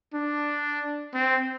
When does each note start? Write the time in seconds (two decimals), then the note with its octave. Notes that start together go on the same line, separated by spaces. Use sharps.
0.14 D4
1.14 C4